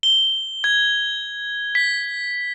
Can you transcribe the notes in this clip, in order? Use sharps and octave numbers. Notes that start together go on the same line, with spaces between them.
G7
G#6
B6